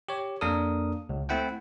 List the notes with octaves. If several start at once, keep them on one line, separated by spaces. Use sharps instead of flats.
G4 C#5
F2 A#3 D4 A4 A#4 D#6
C#2
A3 C4 E4 F#5 G5